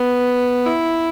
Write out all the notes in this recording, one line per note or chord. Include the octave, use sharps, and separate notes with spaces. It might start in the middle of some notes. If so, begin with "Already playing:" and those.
Already playing: B3
E4